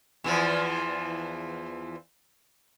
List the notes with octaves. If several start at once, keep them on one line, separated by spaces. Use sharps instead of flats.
E2 E3 F3